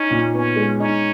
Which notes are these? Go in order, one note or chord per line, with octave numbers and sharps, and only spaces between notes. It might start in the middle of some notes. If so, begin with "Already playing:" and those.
Already playing: C#4 D#4
A#2
B3 C#4
G#3
C#4 D#4